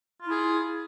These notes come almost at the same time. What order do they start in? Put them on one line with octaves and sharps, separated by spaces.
F4 E4 G#4